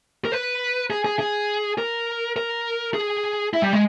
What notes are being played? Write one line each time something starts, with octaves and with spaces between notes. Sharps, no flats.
A#4
B4
G#4
G#4
G#4
A#4
A#4
G#4
E4
G3
G#3